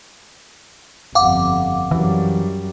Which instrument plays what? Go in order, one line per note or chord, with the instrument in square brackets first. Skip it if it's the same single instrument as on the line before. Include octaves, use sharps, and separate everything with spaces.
[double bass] G1 F2 [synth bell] F5 F#5 D6
[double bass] F#2 G3 [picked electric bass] E3